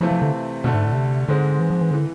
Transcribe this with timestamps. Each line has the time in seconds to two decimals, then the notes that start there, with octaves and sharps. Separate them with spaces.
0.01 C3 E3 F3 A3 C4 F4
0.11 F3
0.22 D3
0.64 D2 B2 D3 A3
0.74 G#2
0.85 A2
0.92 B2
0.96 C3
1.28 G#2 D3 G#3 C4
1.60 E3
1.70 F3
1.81 E3
1.91 D3 E3